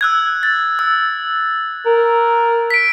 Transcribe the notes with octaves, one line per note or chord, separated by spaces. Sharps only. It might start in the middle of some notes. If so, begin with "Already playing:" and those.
E6 F#6 G#6
A6
E6
A#4
B6 D7